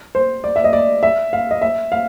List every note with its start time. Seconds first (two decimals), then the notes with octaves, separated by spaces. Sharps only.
0.15 C5
0.44 D5
0.56 E5
0.64 D#5
0.73 D5
1.03 E5
1.33 F5
1.51 D#5
1.62 E5
1.92 F5